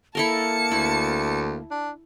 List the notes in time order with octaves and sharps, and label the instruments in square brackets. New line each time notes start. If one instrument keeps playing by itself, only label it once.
[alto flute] A#3 [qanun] E4 A4 A#4 [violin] A5 C#7
[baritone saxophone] D2 [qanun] E4
[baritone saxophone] D4